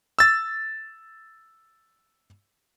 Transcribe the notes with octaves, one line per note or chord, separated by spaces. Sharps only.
E6 A6